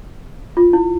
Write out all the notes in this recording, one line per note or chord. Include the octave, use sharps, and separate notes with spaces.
F4
E4